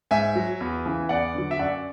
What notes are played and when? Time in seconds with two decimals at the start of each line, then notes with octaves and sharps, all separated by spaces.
0.11 G#2 E5 G#5
0.36 F#3
0.61 E2
0.86 C#3 E3
1.09 E2 D5 F#5
1.34 D3 F#3
1.51 E5
1.59 F#2 D5 F#5